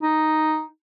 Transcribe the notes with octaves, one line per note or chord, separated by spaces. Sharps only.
D#4